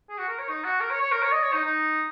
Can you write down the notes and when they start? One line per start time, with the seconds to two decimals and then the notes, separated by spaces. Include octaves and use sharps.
0.10 G#4
0.18 F#4
0.29 A#4
0.39 C#5
0.49 D#4
0.64 F#4
0.80 A#4
0.91 C#5
1.01 C#5
1.12 A#4
1.22 C#5
1.32 D#5
1.43 C#5
1.53 D#4
1.63 D#4